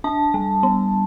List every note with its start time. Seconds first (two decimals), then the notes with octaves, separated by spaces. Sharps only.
0.04 D4 A5
0.34 G3
0.63 B3